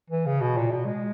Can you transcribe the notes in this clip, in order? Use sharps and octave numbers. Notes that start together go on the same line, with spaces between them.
E3
C#3
B2
A#2
B2
G#3